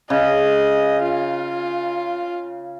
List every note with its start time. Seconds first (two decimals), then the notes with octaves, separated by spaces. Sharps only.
0.10 C#3 D#5
1.02 F4